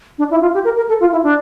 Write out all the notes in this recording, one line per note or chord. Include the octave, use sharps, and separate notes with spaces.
D4
E4
F4
G4
A#4
A#4
A4
F4
E4
D4